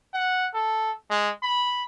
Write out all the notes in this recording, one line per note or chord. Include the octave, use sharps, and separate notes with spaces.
F#5
A4
G#3
B5